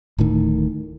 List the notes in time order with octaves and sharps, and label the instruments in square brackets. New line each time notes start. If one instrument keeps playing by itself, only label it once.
[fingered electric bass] D1 A2 D#3